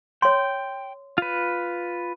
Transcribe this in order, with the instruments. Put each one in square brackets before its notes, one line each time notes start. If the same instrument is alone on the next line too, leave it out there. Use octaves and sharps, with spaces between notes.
[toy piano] C#5 C6 [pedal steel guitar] G5
[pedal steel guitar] F4 B4